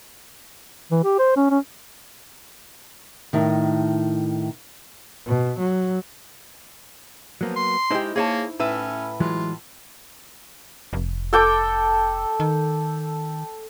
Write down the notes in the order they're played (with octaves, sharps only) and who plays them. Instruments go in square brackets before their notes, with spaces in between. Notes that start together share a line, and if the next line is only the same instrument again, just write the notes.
[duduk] E3
G4
C5
C#4
C#4
[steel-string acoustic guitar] A2 D#3
[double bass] B2
F#3
[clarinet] F3 [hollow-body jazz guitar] F#3 A#3 B3
[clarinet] C6
[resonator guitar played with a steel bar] G#3 G4 [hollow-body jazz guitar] D#4 E4 C5
[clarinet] A#3 [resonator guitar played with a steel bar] G#4 C#5 A5
[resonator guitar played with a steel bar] A2 B4 E5 [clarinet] C#4
[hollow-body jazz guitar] E3 F#3 G#3 [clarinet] F4
[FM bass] F1
[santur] A4 G5 D6
[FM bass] D#3